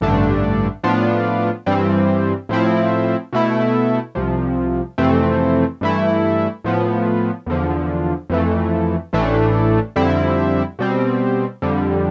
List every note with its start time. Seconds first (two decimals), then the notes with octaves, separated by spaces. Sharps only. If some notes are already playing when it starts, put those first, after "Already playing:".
0.01 A1 G2 D3 A3 D4
0.83 A2 F3 B3 D4 F4
1.66 G2 E3 G3 C4
2.49 A2 F3 C4 E4
3.33 B2 A3 E4
4.15 C2 C3 F3
4.98 F2 C3 E3 A3 C4
5.81 G2 E3 A3 E4
6.64 A2 F3 B3
7.46 E2 D3 F3
8.30 F2 E3 A3
9.13 A1 A2 E3 A3 D4
9.96 F2 D3 G3 C4 E4
10.79 B2 G3 C4
11.62 F2 D3 G3